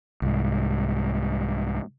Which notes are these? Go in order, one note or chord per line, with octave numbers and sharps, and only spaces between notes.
C2 G#2